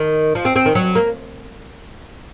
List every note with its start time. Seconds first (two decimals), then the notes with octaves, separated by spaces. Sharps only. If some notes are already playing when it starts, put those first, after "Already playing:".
Already playing: D#3
0.35 F3
0.45 C4
0.56 C4
0.66 D#3
0.75 F#3
0.95 A#3